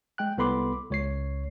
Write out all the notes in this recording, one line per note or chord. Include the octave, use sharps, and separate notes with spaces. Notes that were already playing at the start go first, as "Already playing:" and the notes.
G#3 G5 F#6
C2 B3 A4 B5 C6 D6
C#2 C#5 C7